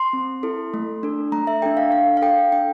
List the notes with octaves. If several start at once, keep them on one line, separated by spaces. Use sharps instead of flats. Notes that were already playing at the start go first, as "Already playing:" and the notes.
Already playing: C6
C4
E4 A4
A3
D4 A4
A3 A#5
E5
D4 A4 G5
F5
D4 F5
F5
A4 G5
D4 G5